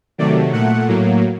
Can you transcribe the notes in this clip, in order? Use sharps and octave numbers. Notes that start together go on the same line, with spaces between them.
C3 D#3 F#3 A3 D5
A#2 A3 F#5
A2 F#3 A#3